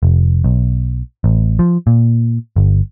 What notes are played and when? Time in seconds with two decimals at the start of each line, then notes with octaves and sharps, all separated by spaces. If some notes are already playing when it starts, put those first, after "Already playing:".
0.03 F1
0.44 B1
1.24 A1
1.59 F3
1.87 A#2
2.56 G1